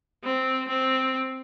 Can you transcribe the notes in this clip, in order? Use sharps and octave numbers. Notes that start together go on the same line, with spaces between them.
C4
C4